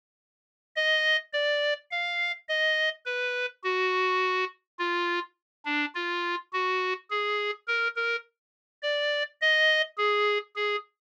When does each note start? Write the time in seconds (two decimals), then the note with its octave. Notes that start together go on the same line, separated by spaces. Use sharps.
0.76 D#5
1.33 D5
1.91 F5
2.49 D#5
3.06 B4
3.64 F#4
4.79 F4
5.65 D4
5.95 F4
6.53 F#4
7.10 G#4
7.68 A#4
7.96 A#4
8.83 D5
9.41 D#5
9.98 G#4
10.56 G#4